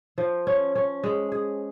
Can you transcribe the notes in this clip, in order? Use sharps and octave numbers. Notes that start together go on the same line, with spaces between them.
F3
C#4
C#4
G#3
G#4